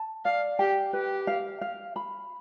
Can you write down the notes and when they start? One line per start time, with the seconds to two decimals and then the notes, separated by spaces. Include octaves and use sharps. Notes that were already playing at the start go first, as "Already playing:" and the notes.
Already playing: A5
0.25 D5 F5
0.59 G4 G5
0.93 G4 B4
1.27 F5
1.61 F5
1.96 B5